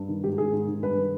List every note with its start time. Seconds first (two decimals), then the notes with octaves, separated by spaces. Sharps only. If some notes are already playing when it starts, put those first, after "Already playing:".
Already playing: G2
0.09 D#3
0.24 G#2 G4
0.38 D#3 G#4
0.53 G#2
0.68 D#3
0.83 G2 B4
0.97 D#3